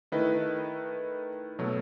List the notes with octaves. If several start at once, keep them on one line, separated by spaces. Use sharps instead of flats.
D#3 A3 E4 B4 D#5
B2 F#3 A3